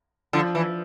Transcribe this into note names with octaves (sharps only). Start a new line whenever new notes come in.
D3 F3
E3